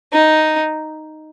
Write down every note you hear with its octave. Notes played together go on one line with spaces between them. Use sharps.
D#4